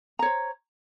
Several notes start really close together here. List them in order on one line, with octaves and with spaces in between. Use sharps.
A#5 C#5 C5